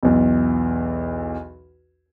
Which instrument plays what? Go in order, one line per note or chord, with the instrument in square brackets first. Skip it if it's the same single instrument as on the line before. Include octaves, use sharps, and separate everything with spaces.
[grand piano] B1 E2